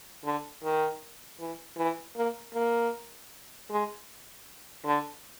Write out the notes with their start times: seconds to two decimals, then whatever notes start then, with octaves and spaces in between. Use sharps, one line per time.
0.24 D3
0.63 D#3
1.40 E3
1.77 E3
2.16 A#3
2.54 A#3
3.70 G#3
4.85 D3